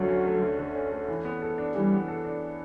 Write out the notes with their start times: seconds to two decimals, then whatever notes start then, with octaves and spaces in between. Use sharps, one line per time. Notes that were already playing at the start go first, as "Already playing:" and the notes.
Already playing: D2 D3 F#3
0.08 C#4
0.25 A3
0.42 D2
0.58 D3
0.75 C#4
0.92 A3
1.08 E3
1.25 B3
1.42 A4
1.58 D4
1.74 E3 G3
1.92 B3
2.08 A4
2.25 D4